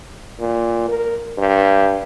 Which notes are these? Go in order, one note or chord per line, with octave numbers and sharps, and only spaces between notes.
A#2
A#4
G2